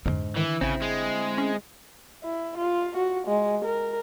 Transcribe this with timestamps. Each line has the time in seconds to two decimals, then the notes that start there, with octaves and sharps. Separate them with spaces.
0.06 B1 F2 G#2 D3
0.36 D#3 E3
0.61 A1 C#3 C4 E4
0.82 G#3
1.38 C#4
2.24 E4
2.58 F4
2.97 F#4
3.27 G#3
3.65 A#4